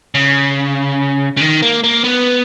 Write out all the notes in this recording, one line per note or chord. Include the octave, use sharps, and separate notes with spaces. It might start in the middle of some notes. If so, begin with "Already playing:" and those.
C#3
C#3
D#3
A#3
A#3
B3